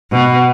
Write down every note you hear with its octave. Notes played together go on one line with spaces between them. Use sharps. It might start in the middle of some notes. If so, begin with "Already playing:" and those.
B2